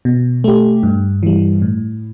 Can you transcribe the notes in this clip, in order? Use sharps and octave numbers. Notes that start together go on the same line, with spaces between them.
B2
A3 G4
G2
E3 G3
A2